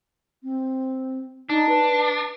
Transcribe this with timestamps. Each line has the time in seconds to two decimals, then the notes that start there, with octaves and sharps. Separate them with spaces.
0.43 C4
1.50 D4 D#4
1.69 B4